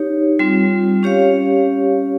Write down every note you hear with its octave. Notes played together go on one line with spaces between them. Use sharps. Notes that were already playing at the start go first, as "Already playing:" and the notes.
Already playing: D#4 G4 C#5
G3 C4 F4
C#4 G4 C#5 F5